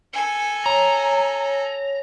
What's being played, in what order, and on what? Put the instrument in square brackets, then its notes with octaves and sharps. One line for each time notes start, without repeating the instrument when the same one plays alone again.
[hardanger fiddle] A4 G#5
[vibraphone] C#5 [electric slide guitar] A#5